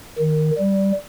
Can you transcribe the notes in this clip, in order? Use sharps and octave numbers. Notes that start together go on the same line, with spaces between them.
D#3
G3